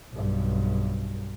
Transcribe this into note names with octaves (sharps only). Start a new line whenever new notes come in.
B1 G2